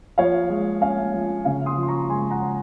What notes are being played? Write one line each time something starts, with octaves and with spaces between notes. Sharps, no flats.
F3 C#5 F5
G#3
C#4 F5 G#5
F3
C#3 F5 G#5
C6 D#6
F3
C6
A#5 C#6
G#3 G#5 C6
F#5 A#5
C#4